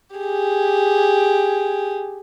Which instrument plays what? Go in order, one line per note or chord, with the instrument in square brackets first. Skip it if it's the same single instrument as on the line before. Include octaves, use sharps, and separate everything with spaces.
[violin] G4 G#4